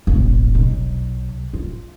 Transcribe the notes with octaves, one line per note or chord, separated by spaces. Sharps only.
E1 A1
B1
F4